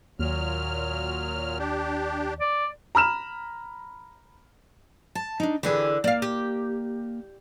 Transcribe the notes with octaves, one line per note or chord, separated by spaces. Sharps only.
D#2 A#2 F#3 F6
D4 G4
D5
A#5 B5 F6 E7
A5
D4 D#4
D3 E3 G4 G#4
A#3 D5 F5
G4